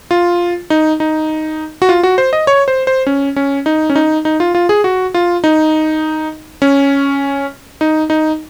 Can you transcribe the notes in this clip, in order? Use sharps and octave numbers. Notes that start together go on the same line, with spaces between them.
F4
D#4
D#4
F#4
F4
F#4
C5
D#5
C#5
C5
C5
C#4
C#4
D#4
C#4
D#4
D#4
F4
F4
G#4
F#4
F4
D#4
C#4
D#4
D#4